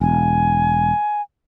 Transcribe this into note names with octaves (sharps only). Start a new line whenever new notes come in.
E1 G#5